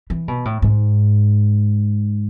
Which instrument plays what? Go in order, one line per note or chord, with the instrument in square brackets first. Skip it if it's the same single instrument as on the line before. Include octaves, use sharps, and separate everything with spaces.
[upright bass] E3
B2
A2
G#2